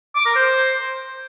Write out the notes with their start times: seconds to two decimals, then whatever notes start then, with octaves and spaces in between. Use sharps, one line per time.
0.15 D6
0.26 A#4
0.36 C5